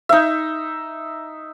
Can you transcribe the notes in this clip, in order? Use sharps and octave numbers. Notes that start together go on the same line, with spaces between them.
D#4 E5